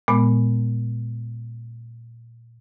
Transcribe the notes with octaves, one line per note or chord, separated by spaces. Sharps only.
A#2 G#3 B3